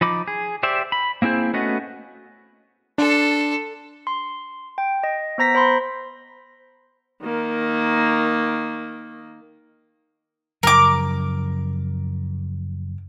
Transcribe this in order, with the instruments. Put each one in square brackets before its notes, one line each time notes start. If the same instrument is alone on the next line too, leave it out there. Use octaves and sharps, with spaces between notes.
[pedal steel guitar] F3 D#4 B5 D6
G#4
G4 C5 D5 E5
B5
A#3 C4 E4 G#4 C5
A3 B3 C#4 F#4 D#5
[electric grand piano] D4 [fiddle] A4 C6
[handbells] C6
G5
D#5
B3 C5 A#5 A#6 B6
C5 B5 C6
[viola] D#3 A#3
[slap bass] F#2 C#3 F3 [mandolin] A#4 D6